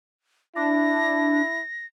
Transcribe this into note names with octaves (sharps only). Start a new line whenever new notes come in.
D4 E4 A#6